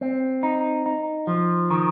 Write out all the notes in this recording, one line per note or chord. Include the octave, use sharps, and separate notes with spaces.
C4
D#4
D#4
F3
D#3